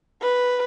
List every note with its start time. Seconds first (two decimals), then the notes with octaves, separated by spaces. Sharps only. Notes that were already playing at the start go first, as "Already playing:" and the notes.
0.22 B4